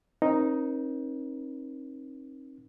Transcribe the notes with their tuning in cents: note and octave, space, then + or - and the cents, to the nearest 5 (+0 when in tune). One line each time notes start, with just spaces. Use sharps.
C4 +40 D#4 +0 A#4 +35